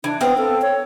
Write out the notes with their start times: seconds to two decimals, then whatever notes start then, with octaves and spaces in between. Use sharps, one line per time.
0.04 E3 D4
0.21 B3 C4 F5
0.38 A4
0.62 C#5